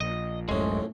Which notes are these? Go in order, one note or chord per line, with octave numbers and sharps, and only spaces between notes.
A#1 D#5
D1 C2 F#2 A2 G#3 C#4